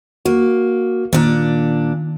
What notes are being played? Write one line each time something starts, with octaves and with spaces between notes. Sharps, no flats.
A#3 F#4
A#2 D#3 D4